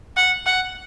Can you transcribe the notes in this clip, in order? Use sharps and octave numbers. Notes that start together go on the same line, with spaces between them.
F#5
F#5